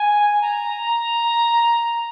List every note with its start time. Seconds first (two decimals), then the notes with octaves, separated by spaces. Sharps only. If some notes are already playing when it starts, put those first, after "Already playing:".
Already playing: G#5
0.41 A#5